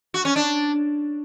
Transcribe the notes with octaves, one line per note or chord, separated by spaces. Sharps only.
F#4
C#4
D4